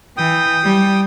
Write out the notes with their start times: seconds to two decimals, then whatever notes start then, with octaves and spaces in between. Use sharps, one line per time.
0.17 E3 G5 D#6
0.63 G3